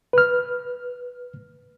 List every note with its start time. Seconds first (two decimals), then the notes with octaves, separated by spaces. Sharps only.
0.13 B4 F6